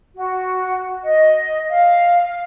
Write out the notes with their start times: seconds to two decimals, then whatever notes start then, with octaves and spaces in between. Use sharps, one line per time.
0.16 F#4
1.04 D#5
1.70 F5